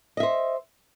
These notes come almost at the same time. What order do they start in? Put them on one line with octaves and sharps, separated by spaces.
D#5 E5 C5